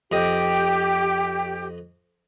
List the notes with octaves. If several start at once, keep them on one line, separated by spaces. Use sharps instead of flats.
F2 G4 D#5